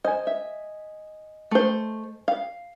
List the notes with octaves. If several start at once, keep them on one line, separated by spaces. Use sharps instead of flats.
C5 D#5 G#5
E5
A3 C5
F5